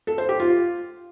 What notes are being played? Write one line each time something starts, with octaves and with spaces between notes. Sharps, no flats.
A4
C5
G4
F4